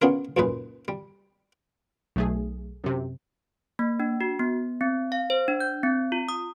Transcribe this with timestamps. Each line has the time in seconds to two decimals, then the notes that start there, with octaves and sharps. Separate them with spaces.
0.02 B3 C#4 D4 F4 G#4 A#4
0.37 C#2 F#2 A#2 G#3 D#4 B4
0.88 G3
2.16 B1 A3 G#4
2.84 F#2 C3
3.79 A#3
4.00 D4
4.21 F#4
4.39 B3
4.81 C4
5.12 F5
5.30 C5
5.48 D4
5.60 G6
5.83 C4
6.12 F4
6.29 D#6